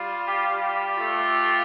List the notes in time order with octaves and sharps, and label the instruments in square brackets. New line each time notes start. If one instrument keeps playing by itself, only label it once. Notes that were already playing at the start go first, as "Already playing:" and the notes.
Already playing: [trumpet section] G3 F4
G4
G4
A3 F4